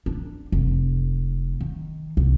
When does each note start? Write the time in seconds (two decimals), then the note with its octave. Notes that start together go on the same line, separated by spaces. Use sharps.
0.06 D4
0.52 F1
1.61 D#3
2.17 C2